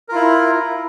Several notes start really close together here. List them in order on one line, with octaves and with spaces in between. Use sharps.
A#4 F4 E4